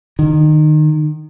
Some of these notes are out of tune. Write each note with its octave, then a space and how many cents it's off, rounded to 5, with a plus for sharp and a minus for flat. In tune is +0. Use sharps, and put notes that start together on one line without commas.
D#3 -25